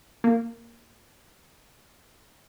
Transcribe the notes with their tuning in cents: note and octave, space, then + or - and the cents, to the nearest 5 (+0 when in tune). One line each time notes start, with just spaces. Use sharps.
A#3 -5